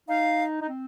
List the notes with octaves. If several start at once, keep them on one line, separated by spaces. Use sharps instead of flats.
D#4 F5
D#4
C4